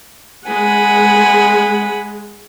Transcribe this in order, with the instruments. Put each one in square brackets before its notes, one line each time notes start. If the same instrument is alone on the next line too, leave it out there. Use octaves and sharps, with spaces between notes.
[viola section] G#3 [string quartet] F#5 G#5 B5